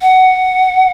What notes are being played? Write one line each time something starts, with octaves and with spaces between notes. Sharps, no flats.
F#5